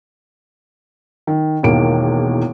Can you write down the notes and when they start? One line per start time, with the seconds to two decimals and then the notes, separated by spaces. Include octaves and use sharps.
1.27 D#3
1.63 E1 E2 D#3 A#3 D7